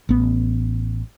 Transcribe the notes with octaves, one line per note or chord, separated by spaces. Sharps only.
A1 B3